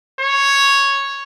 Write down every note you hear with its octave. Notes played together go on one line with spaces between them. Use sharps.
C#5